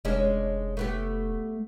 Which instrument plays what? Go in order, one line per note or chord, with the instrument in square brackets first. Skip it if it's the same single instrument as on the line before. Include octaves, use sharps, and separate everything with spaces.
[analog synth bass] F1 [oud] G#3 C#4 D4
[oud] A3 B3 G4